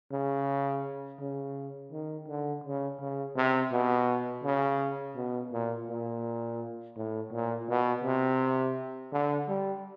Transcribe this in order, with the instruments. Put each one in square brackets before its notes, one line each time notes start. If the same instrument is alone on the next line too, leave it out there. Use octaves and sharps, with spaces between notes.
[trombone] C#3
C#3
D#3
D3
C#3
C#3
C3
B2
C#3
B2
A#2
A#2
A2
A#2
B2
C3
D3
G3